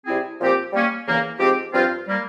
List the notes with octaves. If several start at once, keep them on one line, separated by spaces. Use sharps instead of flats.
C3 G3 C4 E4 G#4
A#2 F3 C4 G4 C5
G3 A#3 C#4
E2 C#3 E3 A#3
G#2 F3 C4 G4
G2 F3 C4 F4 C5
G3 A#3